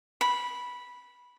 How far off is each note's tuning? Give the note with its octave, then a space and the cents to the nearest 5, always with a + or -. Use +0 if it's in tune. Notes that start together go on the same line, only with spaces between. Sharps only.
B5 -10